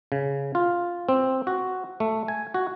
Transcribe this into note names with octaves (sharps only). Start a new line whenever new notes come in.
C#3
F4
C4
F#4
A3
G#5
F#4